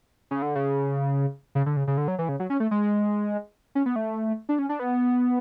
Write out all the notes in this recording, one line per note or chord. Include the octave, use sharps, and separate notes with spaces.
C#3
D3
C#3
C#3
D3
C#3
C#3
D3
F#3
E3
C#3
F#3
C#4
A3
G#3
C#4
B3
A3
D4
C#4
D4
B3